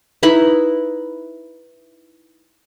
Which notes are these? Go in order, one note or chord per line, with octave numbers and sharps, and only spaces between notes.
D#4 E4 B4 B5